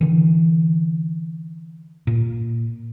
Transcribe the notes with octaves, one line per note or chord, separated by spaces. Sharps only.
D3 E3
A#2